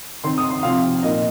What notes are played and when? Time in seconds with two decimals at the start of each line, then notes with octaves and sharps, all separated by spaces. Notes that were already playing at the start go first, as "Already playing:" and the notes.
0.24 D#3 C4 D#4 C6
0.38 D#6
0.50 C6
0.63 C3 F3 C4 F5
1.03 A#2 A#3 D#4 D#5